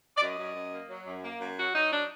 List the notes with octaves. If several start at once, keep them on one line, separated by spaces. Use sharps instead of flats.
D5
F#2 D#5
F#2
F#2
A#3
F#3
F#2
A#3
F#2
F#3 F#4
F#3 D#4
D4